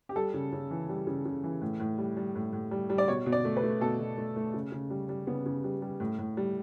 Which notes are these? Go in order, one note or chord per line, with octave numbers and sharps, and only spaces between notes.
G4
G3 A4
C#3
C#3
E3
G3
C#3
C#3
E3
A2
A2
G3
G3
A2
A2
G3
G3
D5
B2 C#5
B2
D5
A3
B4
A3
B2 A4
B2
A3
A3
C#3
C#3
G3
G3
C#3 B3
C#3
G3
G3
A2
A2
G3